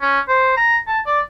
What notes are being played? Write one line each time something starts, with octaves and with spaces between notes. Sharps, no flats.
C#4
C5
A#5
A5
D5